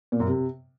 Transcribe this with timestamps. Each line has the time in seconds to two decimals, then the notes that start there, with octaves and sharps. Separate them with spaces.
0.12 A#2
0.20 F#2
0.27 C3